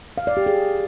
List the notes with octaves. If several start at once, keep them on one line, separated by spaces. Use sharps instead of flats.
F5
D5
G4
G#4